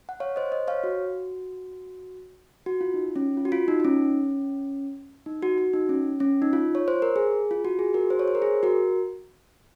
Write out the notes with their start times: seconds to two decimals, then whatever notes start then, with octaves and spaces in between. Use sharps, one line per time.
0.09 F#5
0.20 C#5 F5
0.36 C5 D#5
0.52 C5 D#5
0.68 C#5 F5
0.84 F#4
2.66 F#4
2.81 F4
2.94 D#4
3.16 C#4
3.37 F4
3.45 F#4
3.52 F4
3.68 D#4
3.80 D#4
3.85 C#4
5.26 D#4
5.42 F#4
5.58 F#4
5.73 D#4
5.89 C#4
6.20 C#4
6.42 D#4
6.53 F4
6.75 C#5
6.88 C5
7.02 A#4
7.16 G#4
7.51 F4
7.65 F#4
7.79 G#4
7.94 F#4 A#4
8.10 G#4 C5
8.19 C#5
8.28 C5
8.35 A#4
8.42 G#4
8.63 F#4 A#4